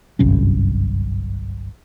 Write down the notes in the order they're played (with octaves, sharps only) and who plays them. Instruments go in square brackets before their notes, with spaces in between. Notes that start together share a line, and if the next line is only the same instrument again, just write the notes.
[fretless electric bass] G1 C2 F#2 C#4